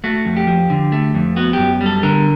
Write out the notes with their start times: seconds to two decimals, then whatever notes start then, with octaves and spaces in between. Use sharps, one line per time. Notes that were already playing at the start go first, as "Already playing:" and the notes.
0.04 A3 F#4
0.25 F2
0.37 G4
0.47 F3
0.70 D3
0.92 A3
1.14 F2
1.36 B3 F#4
1.53 F#2 G4
1.81 G3
1.86 A4
2.03 D3 A#4